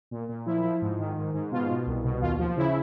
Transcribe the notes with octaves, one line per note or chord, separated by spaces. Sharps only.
A#2
A#2
F3 E4
F3
G#2
D#3
G#2
G#2
B2 F4
B2
C2
B2
D#2 F4
F3
C#3 E4